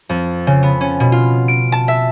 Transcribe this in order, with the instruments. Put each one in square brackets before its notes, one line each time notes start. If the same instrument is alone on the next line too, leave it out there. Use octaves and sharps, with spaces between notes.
[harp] F2
C#3
B3
C#4
B2
F4
D7
A5
E5